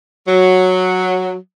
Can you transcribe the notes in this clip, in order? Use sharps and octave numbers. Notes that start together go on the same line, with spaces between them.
F#3